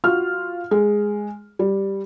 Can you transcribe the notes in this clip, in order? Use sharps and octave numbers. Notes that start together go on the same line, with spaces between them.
F4 F#4 F6
G#3
G3